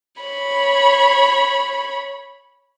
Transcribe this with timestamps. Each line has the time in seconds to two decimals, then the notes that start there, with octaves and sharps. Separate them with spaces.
0.22 C#5 B5